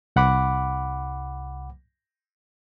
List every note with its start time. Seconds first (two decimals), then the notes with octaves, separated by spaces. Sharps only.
0.16 C2 F#5 B5 D6